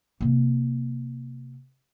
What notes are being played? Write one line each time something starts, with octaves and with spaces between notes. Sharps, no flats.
C3 A#3